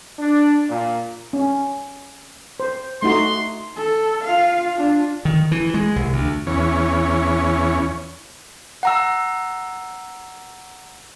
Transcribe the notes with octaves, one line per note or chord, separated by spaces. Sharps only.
D4
A#2
C#4
C5
A3 D#4 F#4 C6
A4
F4 F5
D4 F4
D#3
E3
G#3
C2
D2
E2 C#4
F#5 A#5 E6